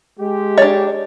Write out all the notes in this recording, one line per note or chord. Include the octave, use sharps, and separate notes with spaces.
G#3 G4
D4 C#5 D#5